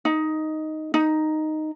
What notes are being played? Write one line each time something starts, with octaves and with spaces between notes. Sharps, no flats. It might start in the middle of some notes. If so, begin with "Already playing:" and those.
D#4
D#4